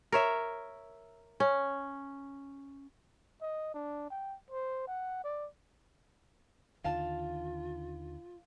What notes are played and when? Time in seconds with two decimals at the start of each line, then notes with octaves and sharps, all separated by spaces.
0.12 A#4 C#5 E5
1.40 C#4
3.42 D#5
3.74 D4
4.10 G5
4.51 C5
4.87 F#5
5.24 D5
6.84 D#2 D3 D#3 F4 F5 A5